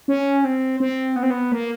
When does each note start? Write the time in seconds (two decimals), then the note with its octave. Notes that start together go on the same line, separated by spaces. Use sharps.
0.08 C#4
0.45 C4
0.80 C4
1.16 B3
1.23 C4
1.30 B3
1.52 A#3